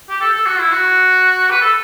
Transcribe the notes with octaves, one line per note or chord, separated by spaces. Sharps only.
G4
A4
A4
F#4
E4
F#4
B4
A4